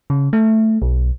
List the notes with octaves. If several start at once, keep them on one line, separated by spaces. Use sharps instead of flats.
C#3
A3
B1